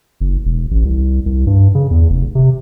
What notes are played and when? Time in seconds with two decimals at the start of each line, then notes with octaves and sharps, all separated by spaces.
0.21 F#1
0.45 E1
0.71 A1
0.85 C2
1.26 C2
1.47 G2
1.75 C#3
1.91 E2
2.10 F1
2.35 C3